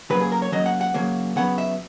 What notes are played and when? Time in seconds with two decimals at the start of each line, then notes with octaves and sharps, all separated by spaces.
0.10 C#3 F#3 A#3 B4
0.20 G#4
0.32 A#4
0.42 C#5
0.52 C#3 F#3 A#3 D#5
0.66 F#5
0.81 F#5
0.94 C#3 F#3 A#3
1.36 C#3 F#3 B3 F#5
1.58 E5